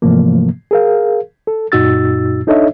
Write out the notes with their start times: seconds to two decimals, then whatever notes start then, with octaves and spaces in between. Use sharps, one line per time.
0.02 G#2 C3 E3 F3 A3 A#3
0.71 G#4 A#4 F5
1.47 A4
1.72 F#2 A#2 D#4 F#4 E6 A6
2.47 D4 D#4 A4 C#5 D#5 E5